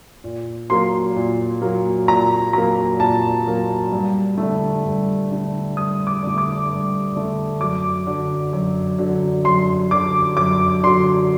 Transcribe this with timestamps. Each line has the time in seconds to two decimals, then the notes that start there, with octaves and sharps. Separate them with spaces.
0.24 A#2
0.70 F#3 A#3 C6
1.16 A#2
1.62 F#3 A#3
2.08 A#2 A#5
2.53 F#3 A#3 A#5
3.00 A#2 A5
3.47 F#3 A#3
3.92 G2
4.38 D3 A3
4.84 G2
5.31 D3 A3
5.77 G2 D#6
6.07 D6
6.23 D3 A3
6.38 D6
6.69 G2
7.15 D3 A3
7.60 F#2 D6
8.07 D3 F#3
8.53 F#2
8.99 D3 F#3
9.45 F#2 C6
9.91 D3 F#3 D6
10.37 F#2 D6
10.83 D3 F#3 C6